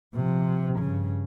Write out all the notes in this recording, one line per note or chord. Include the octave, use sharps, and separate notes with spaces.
C3 F3
G2 C#3